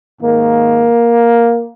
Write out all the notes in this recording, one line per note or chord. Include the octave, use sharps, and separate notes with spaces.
G#2 D#3 A#3